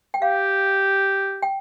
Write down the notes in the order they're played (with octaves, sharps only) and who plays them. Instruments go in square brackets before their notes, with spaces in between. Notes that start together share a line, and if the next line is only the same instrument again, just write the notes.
[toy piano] G5
[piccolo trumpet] G4 [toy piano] F5
[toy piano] G5